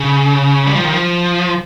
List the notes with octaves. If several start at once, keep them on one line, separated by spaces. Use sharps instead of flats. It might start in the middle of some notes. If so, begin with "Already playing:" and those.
Already playing: C#3
G3
F3
D#3
F3